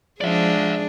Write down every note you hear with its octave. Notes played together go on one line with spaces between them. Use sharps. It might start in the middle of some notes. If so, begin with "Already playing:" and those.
F3 G#3 D4 G#4 D5 E5